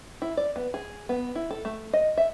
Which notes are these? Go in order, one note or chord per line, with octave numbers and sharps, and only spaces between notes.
E4
D5
B3
G#4
B3
E4
A4
A3
D#5
E5